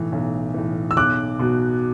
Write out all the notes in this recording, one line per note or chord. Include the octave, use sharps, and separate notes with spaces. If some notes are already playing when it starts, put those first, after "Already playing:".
Already playing: B1 A2 E3
B1
A2 E3
E6
B1 D6 F#6
B2 F#3